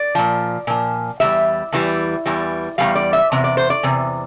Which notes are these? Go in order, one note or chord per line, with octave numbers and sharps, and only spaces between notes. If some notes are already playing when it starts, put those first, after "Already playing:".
Already playing: D5
A#2 F3
A#2 F3
E2 E3 G3 E5
E2 E3 G3
E2 E3 G3
E2 E3 G3 F5
D5
E5
E2 C3
D5
C5
D5
E2 C3